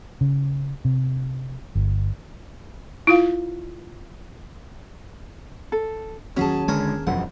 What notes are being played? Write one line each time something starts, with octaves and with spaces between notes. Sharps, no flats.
C#3
C3
G1
E4 F4 F5
A4
D#2 F#3 C#4 G#4 A5
D3 G#3 A#4 C#5 G#5
E1 F#2 F3 F#5